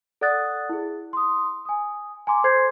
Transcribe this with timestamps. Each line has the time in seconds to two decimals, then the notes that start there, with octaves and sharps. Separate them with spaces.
0.21 A4 D5 F#5 D#6 F#6 A6
0.69 E4 G#4
1.13 C6 D#6
1.65 G#5 D#6
2.27 G#5 A#5 C6 D6
2.44 A4 C5 C6 G6 G#6 C7